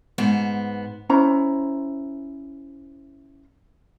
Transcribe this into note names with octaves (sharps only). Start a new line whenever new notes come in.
G#2 B3 C5
C#4 E4 C5 A#5